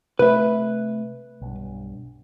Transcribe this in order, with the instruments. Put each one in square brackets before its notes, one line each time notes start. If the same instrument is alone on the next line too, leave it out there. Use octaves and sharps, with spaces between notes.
[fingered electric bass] C3 A3 [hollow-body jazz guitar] B4 E5
[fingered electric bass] B1 G2